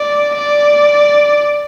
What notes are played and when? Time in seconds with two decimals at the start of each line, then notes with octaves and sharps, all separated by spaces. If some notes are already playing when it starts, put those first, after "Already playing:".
Already playing: D5
0.35 D5